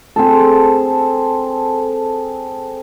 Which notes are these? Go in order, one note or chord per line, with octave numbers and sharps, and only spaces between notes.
C4 G#4 A4